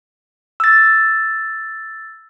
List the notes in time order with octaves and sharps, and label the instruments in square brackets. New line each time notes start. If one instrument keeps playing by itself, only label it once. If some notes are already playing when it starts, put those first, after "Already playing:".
[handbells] E6 A6